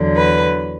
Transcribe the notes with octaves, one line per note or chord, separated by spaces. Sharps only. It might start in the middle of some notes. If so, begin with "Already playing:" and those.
Already playing: E2 D3 F#3
B4